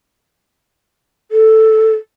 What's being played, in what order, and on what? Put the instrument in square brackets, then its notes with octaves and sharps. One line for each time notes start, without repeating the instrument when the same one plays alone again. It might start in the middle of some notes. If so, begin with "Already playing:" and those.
[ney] A4